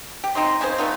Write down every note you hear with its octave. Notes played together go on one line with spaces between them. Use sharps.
G4
C4 D#4 D#5 C6
C#3 C4 G#4 C5
A3 B3 D#4 F4